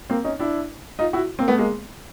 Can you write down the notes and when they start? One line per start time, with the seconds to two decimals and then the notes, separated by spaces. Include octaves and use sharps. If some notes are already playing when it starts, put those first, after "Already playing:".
0.10 A#3 C4
0.24 C#4 D#4
0.39 D4 E4
0.99 D#4 F4
1.13 E4 F#4
1.39 A#3 C4
1.48 A3 B3
1.58 G#3 A#3